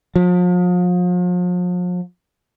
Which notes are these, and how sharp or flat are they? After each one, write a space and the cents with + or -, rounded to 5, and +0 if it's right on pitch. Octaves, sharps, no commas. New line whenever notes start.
F3 +40